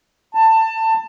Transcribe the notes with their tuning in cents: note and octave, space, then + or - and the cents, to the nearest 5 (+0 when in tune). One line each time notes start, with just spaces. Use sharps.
A5 +20